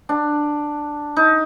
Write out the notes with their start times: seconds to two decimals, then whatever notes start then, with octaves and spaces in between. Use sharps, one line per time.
0.09 D4
1.16 D#4